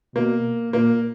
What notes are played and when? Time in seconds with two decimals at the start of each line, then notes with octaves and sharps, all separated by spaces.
0.16 B2 A#3
0.73 A#2 A#3